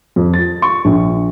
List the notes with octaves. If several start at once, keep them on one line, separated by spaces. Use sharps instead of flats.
F2
A6
C#6
A#1